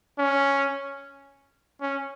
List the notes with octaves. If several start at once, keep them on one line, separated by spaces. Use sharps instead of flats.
C#4
C#4